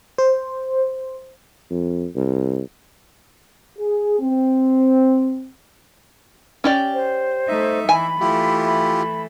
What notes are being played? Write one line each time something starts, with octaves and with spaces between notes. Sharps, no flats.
C5
F2
C2
G#4
C4
C#4 G4 D5
C5
A3 D#4 E5
E3 G#5 B5
E3 A3 E4 F4 G4
B5